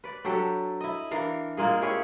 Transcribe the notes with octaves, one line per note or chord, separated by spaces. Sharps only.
B4 D5
F#3 D4 G4 A4
E4 D#5
E3 D4 A#4 F5
A#2 G#3 A#3 G#4
E4 G4 G#4 C#5